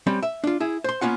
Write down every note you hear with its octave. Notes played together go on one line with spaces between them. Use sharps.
G3 C4 C#4
E5
D4 F4
E4 G#4
C5 C6
A#3 B3 C#4 F4 F#5